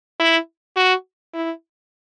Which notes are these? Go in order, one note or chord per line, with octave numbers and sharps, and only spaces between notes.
E4
F#4
E4